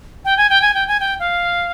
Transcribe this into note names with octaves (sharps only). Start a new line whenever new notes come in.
G5
G#5
G5
G#5
G5
G#5
G5
F5